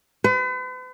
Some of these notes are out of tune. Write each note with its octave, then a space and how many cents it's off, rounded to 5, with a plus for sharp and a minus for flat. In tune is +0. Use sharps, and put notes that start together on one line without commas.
B4 +45